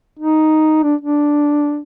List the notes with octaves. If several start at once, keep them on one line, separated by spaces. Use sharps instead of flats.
D#4
D4
D4